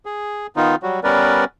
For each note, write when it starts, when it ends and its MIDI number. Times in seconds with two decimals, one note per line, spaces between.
0.06 0.47 68
0.56 0.75 51
0.56 0.75 59
0.56 0.75 63
0.56 0.75 65
0.83 1.00 54
0.83 1.00 55
0.83 1.00 66
1.04 1.45 55
1.04 1.45 59
1.04 1.45 61
1.04 1.45 70
1.04 1.45 71
1.04 1.45 74